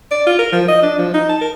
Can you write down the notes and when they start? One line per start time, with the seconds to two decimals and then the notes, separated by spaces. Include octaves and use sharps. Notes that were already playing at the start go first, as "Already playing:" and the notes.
0.11 D5
0.27 F4
0.39 A#4
0.52 F3
0.68 D#5
0.83 D4
0.98 F3
1.14 D#4
1.29 A5
1.41 A#4